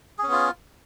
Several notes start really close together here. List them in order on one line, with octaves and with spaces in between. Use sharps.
G#4 C#4 B3 F4